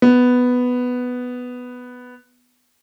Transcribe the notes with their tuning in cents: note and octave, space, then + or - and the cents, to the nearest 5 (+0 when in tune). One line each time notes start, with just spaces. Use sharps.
B3 +5